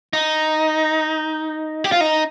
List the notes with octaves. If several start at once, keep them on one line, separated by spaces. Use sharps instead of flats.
D#4
G4
F4
D#4